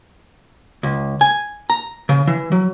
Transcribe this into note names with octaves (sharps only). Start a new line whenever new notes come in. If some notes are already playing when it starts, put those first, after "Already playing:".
C#2
G#5
A#5
C#3
E3
F#3